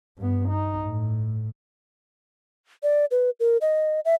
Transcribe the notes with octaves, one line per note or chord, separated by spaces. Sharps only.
G2 B3
D#4
A2
D5
B4
A#4
D#5
E5